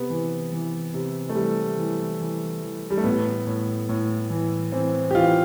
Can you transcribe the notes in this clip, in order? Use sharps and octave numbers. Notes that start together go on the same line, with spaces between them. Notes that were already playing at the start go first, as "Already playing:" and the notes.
Already playing: C3 B3
E3
E3
C3
A3
E3 G3
E3
E3
E3
G3
A3
A2 B3
A2
A2
E3
E3 C4
G4
E3 F4